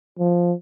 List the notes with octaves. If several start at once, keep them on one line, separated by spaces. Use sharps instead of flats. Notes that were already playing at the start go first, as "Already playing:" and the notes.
F3